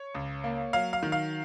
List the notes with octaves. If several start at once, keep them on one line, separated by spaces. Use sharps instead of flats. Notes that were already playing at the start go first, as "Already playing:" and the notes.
Already playing: C#5
C#2
A#3
F#3 F5
F5
D#3
F5